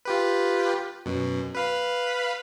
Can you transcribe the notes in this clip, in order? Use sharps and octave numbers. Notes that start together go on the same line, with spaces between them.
F4 G4 B4
F#2 B2
B4 F5 B5